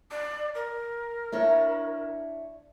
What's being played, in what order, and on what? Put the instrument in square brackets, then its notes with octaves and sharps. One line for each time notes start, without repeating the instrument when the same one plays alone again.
[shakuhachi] D5
A#4
[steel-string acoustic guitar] D4 E4 C#5